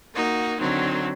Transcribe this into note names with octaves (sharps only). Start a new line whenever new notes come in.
A#3 D#4 F#4
D3 D#3 F#3 C4